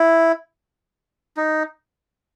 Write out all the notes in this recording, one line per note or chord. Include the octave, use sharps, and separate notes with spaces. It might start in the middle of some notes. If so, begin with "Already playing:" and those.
Already playing: E4
D#4